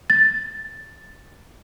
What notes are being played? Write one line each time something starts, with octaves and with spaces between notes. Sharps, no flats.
A6